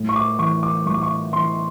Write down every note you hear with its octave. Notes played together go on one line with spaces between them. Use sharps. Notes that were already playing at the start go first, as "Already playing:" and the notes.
Already playing: A2
C#6
D6
E3 C#6
D6
A2 C#6
D6
C#6
E3 C6